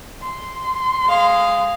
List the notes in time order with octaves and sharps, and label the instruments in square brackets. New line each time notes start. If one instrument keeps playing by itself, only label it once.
[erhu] C6
[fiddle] G#3 F5